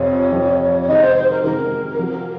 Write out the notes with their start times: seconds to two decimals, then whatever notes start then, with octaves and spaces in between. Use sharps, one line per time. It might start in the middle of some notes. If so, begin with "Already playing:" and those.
Already playing: F2 C3 F3 C#5
0.31 F2 C3 F3
0.81 C#5
0.88 C3 D#3 G#3 D#4 F#4 D#5
1.02 C5
1.15 C5
1.30 A#4
1.43 C3 D#3 G#3 D#4 F#4 A#4
1.99 F3 C4 F#4